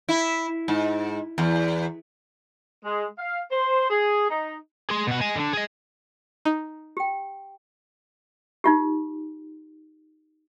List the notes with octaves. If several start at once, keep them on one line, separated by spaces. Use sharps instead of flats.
E4
G#2
E2
G#3
F5
C5
G#4
D#4
G#4 C6
B2 F#5
D#5 G#5
D3 D4
G#4 D#5
D#4
G4 G5
D#4 F4 G4